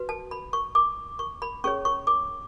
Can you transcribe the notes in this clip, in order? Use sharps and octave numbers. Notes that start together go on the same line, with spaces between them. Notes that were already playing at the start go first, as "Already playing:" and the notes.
Already playing: F#4 B4
A5
B5
C#6
D6
C#6
B5
C#4 G#4 C#5 C#6
C#6
D6